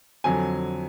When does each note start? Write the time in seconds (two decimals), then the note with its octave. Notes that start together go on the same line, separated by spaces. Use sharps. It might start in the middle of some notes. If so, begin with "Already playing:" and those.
0.24 F2 D3 F#3 G#5